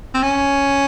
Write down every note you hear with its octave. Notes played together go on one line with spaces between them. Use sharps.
C4
C#4